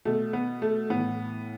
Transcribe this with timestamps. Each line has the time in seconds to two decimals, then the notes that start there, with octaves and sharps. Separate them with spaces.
0.05 B2 A3
0.33 B3
0.62 A3
0.90 A2 E3 B3